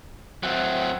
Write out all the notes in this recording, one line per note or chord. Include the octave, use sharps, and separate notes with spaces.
F#3 C4 E5 F#5 G5